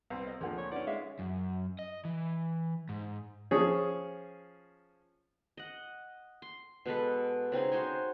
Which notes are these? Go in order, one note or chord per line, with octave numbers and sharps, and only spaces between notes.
C2 B3 C4
D#5
D2 A#2 D3 F3 A#3 G#4 F#5
C#5
C#4 D#4 B4 D5 F#5
G#3 G#4 E5 F5
F#2
D#5
E3
G#2
F3 C#4 G#4
D#5 F#5
C6
B2 G#3 A4 B4
C#3 C4 D#4 G#4
F#4 C5 C#5 G#5